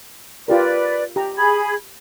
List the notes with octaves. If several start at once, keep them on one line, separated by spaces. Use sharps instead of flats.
F4 G4 A#4 B4 D5
G4 A#5
G#4 B5 G#6